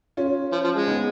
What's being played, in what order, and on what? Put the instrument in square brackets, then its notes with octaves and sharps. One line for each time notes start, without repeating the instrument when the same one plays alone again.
[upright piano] C#4 F4
[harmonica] F3
F3
G#3
[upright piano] B3 D#4